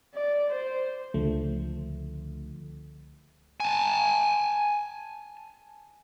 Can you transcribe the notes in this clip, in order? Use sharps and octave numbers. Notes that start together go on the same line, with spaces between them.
D5
C5
C#2 D3 F3 A3
G#5 A5